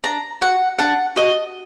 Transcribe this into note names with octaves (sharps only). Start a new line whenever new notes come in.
D4 A#5
F#4 F#5
D4 F#5
F#4 D#5